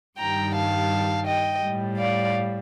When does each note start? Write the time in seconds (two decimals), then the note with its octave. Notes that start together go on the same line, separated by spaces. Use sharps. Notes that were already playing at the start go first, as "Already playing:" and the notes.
0.19 G2 D#3 G3 G5 A#5
0.55 F5 A5
1.26 D#5 G5
1.62 A2 G3
1.98 D5 F5